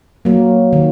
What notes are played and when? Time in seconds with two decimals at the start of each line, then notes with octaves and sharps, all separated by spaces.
0.25 F#3 A#3
0.73 D#3